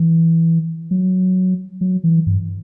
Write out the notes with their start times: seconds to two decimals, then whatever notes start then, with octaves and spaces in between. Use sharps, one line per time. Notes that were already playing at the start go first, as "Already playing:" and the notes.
Already playing: E3
0.91 F#3
1.81 F#3
2.04 E3
2.27 G2